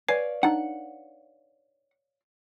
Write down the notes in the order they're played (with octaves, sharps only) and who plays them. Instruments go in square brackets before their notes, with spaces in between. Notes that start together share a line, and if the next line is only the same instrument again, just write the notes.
[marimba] B4 [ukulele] C#5 D5 F5 [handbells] G#5 C7
[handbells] D4 D#4 [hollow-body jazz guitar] F#5